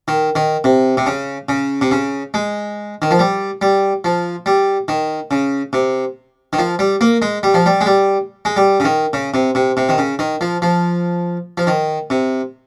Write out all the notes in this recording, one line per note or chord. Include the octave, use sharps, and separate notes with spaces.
D#3
D#3
C3
C3
C#3
C#3
C3
C#3
G#3
D#3
F3
G3
G3
F3
G3
D#3
C#3
C3
D#3
F3
G3
A#3
G#3
G3
F3
G3
G#3
G3
G#3
G3
C#3
D#3
C#3
C3
C3
C3
D#3
C#3
D#3
F3
F3
F3
D#3
C3